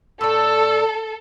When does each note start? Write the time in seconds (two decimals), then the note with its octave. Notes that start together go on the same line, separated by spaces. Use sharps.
0.21 A2 A4 D5 E6